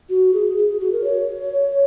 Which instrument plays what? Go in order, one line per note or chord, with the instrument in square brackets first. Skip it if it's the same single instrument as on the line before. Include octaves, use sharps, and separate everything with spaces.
[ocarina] F#4
G#4
G#4
G#4
F#4
A#4
C#5